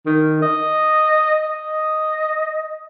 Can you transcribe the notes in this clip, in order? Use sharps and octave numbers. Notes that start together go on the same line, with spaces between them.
D#3
D#5
D#5